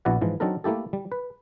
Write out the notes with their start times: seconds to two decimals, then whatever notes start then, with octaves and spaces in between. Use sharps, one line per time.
0.05 A#1 B3 E4 F#4 D5 F#5
0.21 G#2 E3 F3
0.40 F#3 C4 D4 D#4 A4 A#4
0.64 A3 A#3 E4 G4 A4
0.93 G3
1.12 B4